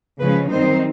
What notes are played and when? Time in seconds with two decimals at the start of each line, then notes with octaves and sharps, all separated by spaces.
0.20 C#3 F3 G#3 C#4 B4
0.51 F#2 D#3 G3 C4 D#4 C5